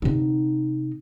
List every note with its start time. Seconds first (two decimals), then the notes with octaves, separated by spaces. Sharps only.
0.02 C3 D#4